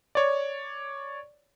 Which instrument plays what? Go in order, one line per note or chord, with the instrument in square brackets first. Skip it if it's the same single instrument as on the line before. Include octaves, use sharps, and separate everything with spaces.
[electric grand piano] C#5 D5